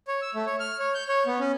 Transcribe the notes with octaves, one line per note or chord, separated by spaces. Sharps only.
C#5
E6
A3
C#5
F6
C#5
G6
C#5
B3
C#4